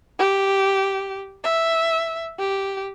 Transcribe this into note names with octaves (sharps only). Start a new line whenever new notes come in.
G4
E5
G4